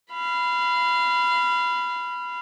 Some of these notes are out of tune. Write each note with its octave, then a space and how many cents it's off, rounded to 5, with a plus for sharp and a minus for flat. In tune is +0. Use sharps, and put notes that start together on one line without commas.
F5 -25 B5 +0